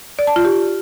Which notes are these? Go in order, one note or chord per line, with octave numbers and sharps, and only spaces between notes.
D5
A5
F4
G4